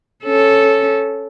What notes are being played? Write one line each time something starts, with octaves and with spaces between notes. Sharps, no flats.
C#4 A4